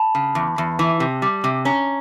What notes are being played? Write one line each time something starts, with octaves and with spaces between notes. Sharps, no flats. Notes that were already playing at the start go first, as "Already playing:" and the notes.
Already playing: A5 B5
C#3
E2
E2
E3
C3
G3
C3
C#4 A#5